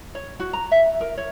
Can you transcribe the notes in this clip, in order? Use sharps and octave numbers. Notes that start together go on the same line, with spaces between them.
C#5
F#4
A#5
E5
A#4
C#5